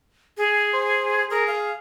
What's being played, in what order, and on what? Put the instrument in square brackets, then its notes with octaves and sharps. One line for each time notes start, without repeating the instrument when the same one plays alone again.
[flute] G#4
[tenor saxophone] C5
[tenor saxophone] G#4 [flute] A#4
[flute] F5